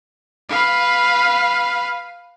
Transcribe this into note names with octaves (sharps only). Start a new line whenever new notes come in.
B4 F5